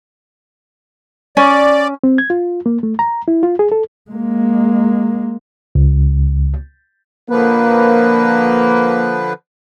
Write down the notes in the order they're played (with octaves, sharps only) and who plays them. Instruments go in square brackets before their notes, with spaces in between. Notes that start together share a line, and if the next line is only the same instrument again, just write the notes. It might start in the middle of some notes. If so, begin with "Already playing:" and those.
[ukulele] C#4 [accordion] D5
[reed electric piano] C4
G#6
F4
A#3
A3
A#5
E4
F4
G#4
A4
[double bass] G#3 A#3
[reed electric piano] C#2
[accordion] D3 F3 B4 [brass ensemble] A#3